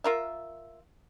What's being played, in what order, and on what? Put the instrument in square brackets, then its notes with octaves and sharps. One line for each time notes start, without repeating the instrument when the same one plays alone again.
[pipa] F4 A#4 E5